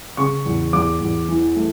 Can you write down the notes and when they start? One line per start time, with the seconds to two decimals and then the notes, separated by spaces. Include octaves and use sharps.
0.17 C#3 C#6
0.46 E2
0.73 E2 D6
1.01 E2
1.29 E3
1.56 A3